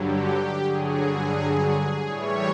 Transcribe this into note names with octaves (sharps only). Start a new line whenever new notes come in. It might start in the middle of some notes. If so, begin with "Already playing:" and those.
Already playing: G2 D3 F#3 G4
G2 D3 F#3 G#4
A2 E3 G3 C#5